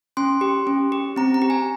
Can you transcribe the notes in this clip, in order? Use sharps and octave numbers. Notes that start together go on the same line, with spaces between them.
C#4 C6
G4
C#4
G4
C4 A#5
A#5
G4
G#5